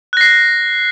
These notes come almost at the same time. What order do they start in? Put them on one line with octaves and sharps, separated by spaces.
F#6 A#6 C7